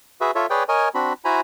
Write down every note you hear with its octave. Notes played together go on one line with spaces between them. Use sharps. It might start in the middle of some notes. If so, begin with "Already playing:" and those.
F#4 G#4 B4 E5
F4 A4 C#5 E5
G#4 B4 C#5 D5 G5
A#4 C#5 D#5 G#5
C4 D4 F#4 B5
E4 F#4 C5 G#5 A#5 B5